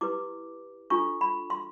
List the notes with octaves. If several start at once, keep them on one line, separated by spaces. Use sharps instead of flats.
E4 G4 B4 D6
D4 F4 A4 C#6
B5
C6